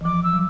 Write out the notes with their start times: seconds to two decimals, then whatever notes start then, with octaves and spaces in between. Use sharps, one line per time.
0.01 E3
0.05 F3 D6
0.24 E6
0.32 F#3